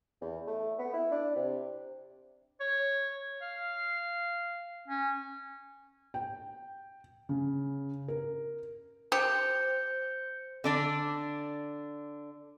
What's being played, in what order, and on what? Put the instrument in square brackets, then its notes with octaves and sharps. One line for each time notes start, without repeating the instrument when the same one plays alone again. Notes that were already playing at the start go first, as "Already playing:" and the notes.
[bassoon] E2
A3
B3
E4
D4
C3
[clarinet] C#5
F5
C#4
[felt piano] G5
C#3
A#4
[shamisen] G4 [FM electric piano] C5 [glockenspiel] G6 C#7
[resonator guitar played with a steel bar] D3 D4 D5